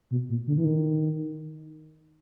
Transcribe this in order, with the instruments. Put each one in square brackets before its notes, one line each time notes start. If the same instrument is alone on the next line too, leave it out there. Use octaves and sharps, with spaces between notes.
[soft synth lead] B2
A#2
D3
E3
D#3